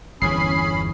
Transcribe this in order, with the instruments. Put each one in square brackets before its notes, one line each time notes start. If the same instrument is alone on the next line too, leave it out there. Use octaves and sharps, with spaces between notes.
[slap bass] G1 E2 E3 [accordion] C#4 B5 [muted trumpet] G#4 [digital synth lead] C7